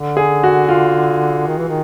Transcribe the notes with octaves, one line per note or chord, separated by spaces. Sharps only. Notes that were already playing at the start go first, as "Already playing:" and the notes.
Already playing: D3
G#4
F#4
F4
D#3
E3
D#3